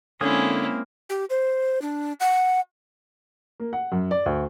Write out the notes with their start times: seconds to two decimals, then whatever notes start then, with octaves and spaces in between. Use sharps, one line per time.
0.21 D3 G#3 A#3 C4 C#4 E4 G#5 D#6
1.10 G4
1.30 C5
1.82 D4
2.20 F#5
3.60 A#3
3.73 F#5
3.92 F#2
4.11 D5
4.26 D2